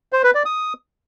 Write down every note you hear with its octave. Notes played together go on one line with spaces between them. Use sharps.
C5
B4
D5
D#6